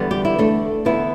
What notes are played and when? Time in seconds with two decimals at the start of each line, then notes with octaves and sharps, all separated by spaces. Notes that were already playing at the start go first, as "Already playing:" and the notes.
Already playing: E2 D3 G3 B3
0.11 G4
0.25 E4
0.38 A3 D4
0.85 E2 D3 B3 E4